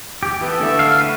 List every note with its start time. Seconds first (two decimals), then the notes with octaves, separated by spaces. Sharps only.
0.23 G4
0.41 E3 B3 A4
0.61 D3 A3 E5
0.79 F5
1.01 F#4 B4